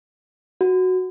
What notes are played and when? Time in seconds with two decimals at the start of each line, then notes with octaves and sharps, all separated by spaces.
0.61 F#4